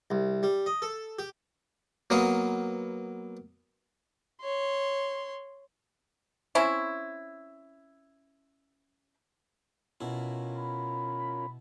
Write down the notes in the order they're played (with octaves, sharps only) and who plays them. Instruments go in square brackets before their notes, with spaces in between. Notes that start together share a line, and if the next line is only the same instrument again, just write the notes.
[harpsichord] C2
G3
D#5
A4
G4
F#3 A#3 B3 F5 D#6
[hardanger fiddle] C#5 C6
[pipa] C4 C#4 E4
[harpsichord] B2 E4 [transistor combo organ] C#4 F4 A#4
[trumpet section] B5